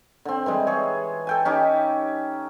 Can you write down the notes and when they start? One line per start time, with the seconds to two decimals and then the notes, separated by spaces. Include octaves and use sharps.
0.25 D3 C4
0.46 E3 G3 G#3
0.67 G#4 C#5
1.27 A4 G5 G#5
1.45 C#4 D#4 G4